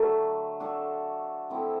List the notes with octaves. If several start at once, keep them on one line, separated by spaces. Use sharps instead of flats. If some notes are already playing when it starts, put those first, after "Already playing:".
Already playing: D3 F#3 A3 D4
A3 D4 F#4 A4
F3 A3 C4 E4